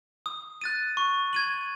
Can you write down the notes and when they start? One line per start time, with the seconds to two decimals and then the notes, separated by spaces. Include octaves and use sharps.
0.26 D#6
0.61 F#6 A6 D#7
0.97 C#6
1.33 G#6 D#7 F#7